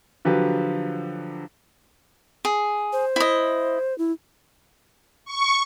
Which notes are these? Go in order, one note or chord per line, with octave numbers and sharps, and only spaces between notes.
D3 F3 F#3 G4 B4
G#4
C5
E4 D#5
E4
C#6